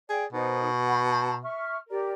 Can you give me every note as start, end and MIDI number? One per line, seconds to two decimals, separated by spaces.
0.09 0.26 68
0.09 0.24 74
0.09 0.24 79
0.32 1.44 47
0.32 0.67 63
0.32 0.67 70
0.32 0.67 72
0.86 0.98 78
0.86 0.98 83
1.04 1.34 81
1.04 1.34 82
1.43 1.77 76
1.43 1.77 85
1.43 1.77 89
1.89 2.14 67
1.89 2.14 70
1.89 2.14 74